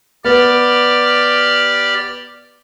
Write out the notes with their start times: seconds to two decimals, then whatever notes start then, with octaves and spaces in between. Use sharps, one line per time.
0.25 B3 G4 D5 F6